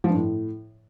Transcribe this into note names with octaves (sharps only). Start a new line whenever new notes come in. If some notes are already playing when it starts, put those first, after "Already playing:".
F3
G2
A2